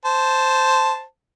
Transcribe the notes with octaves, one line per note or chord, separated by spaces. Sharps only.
C5 A5